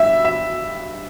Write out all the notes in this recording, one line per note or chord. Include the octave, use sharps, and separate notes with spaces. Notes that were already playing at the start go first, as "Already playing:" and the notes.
Already playing: G2 E5
E5